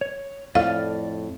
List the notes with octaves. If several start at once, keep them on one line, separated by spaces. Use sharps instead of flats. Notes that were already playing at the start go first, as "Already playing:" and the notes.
C#5
F2 A2 D5 F5 F6